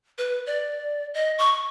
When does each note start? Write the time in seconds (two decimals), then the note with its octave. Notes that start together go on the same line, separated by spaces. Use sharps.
0.18 B4
0.47 D5
1.14 D#5
1.38 C#6